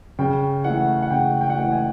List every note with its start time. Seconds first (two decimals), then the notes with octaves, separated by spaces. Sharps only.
0.19 C#3 G5
0.64 E3 A3 F#5
1.02 F#5
1.10 C#3 G5
1.41 G5
1.50 F#5
1.56 E3 A3 G5
1.72 G#5